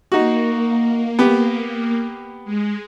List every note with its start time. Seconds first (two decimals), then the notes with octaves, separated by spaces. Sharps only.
0.12 A#3 D#4 F#4
1.19 B3 G4
2.44 G#3